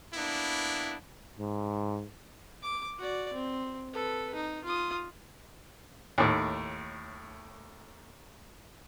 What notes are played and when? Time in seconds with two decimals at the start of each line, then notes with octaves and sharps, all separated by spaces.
0.14 A#3 B3 D4 E4
1.39 G#2
2.62 D6
2.98 F#4 D5
3.33 C4
3.93 A4 B4
4.34 D#4
4.64 F4 D#6
6.18 D#2 A2